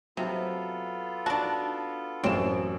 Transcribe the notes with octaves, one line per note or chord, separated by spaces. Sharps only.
C3 F#3 B3 F4 A4
D4 F#4 A5
A1 F#2 C4 E7